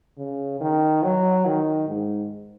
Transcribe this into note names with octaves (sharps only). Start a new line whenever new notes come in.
C#3
D#3
F#3
D#3
G#2